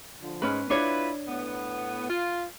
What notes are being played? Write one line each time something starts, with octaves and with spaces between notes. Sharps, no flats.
D3 F3
G#2 C#4 B4
D4 E4 F4 B4 C#5
A2 B3
F4